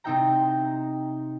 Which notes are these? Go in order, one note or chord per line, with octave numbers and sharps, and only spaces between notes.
C3 C4 D#4 E5 G5 A#5